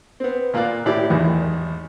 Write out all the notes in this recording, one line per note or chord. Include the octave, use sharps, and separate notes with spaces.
B3 C4
A#2 A#3 F4 D5 F#6
A2 E4 G4 D5
G#1 E2 D#3